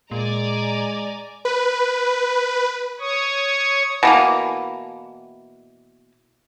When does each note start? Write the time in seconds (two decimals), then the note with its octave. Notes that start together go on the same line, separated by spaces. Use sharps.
0.11 A#2 G#3 D5 G#5 A#5
1.45 B4
3.00 C#5 C#6 D#6
4.03 B2 E3 A#3